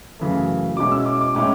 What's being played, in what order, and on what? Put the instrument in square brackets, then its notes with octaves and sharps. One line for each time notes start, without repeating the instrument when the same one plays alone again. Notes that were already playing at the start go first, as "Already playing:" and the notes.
[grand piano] F#2 C#3 E3 A3
B2 G#3 C#4 E4 D6
E6
D6
D6
A2 G#3 C#4 E4 D6